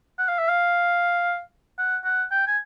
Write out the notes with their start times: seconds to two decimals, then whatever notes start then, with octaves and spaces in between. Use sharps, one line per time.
0.18 F#5
0.28 F5
0.38 E5
0.49 F5
1.78 F#5
2.05 F#5
2.31 G5
2.47 G#5